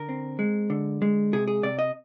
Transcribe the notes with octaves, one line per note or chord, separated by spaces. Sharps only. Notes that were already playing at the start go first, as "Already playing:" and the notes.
Already playing: D3 A#4
C4
G#3
D3
G#3
C3 G#4
G#4
C3 D5
D#5